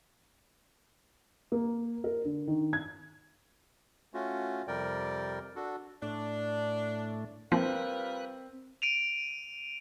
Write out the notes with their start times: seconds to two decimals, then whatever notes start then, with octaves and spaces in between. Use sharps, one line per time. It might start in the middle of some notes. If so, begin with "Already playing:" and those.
1.52 A#3
2.04 A#4
2.25 D3
2.47 D#3
2.73 G#6
4.14 A3 C#4 F4 F#4
4.68 F2 C3 G3 A#4 D5 G5
5.56 D4 F#4 A4
6.02 A2 A3 D4
7.52 F3 G3 C4 F4 A#4 B4 F#6
8.82 D7 D#7 F7